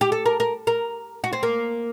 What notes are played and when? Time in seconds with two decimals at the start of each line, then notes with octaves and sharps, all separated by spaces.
0.01 G4
0.12 A4
0.26 A#4
0.40 A#4
0.67 A#4
1.24 F#4
1.33 C4
1.43 A#3